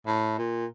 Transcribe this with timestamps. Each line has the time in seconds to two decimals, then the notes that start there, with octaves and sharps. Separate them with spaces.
0.06 A2
0.38 A#2